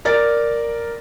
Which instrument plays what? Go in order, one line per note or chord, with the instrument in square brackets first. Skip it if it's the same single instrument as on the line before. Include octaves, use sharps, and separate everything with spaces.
[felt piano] A#4 D5 A6